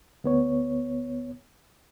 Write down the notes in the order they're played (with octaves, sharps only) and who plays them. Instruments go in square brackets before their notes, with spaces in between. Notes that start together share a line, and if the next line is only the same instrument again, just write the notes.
[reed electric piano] D2 B3 C#5